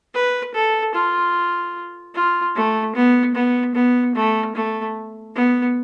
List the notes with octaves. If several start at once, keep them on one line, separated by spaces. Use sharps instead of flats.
B4
A4
F4
F4
A3
B3
B3
B3
A3
A3
B3